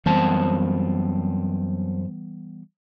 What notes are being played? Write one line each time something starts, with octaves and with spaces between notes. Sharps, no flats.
F#2 E3 G3 B3 C4 A5